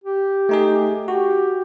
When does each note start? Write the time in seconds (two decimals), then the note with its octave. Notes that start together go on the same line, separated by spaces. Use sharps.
0.04 G4
0.49 A3 D#4 G#4
1.08 F#4 G4